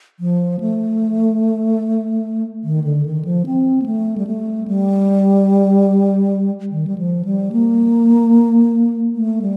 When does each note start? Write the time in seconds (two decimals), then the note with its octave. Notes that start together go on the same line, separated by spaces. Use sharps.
0.20 F3
0.60 A3
2.64 D#3
2.84 D3
3.06 D#3
3.25 F3
3.46 C4
3.82 A#3
3.86 A3
4.18 G3
4.27 A3
4.68 G3
6.71 D#3
6.87 G3
6.98 F3
7.25 G3
7.52 A#3
9.15 A3
9.42 G3